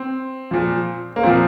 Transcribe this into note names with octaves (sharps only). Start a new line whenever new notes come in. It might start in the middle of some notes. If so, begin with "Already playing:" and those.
Already playing: C4
A#2 F3
A#3
A#2 F3 C4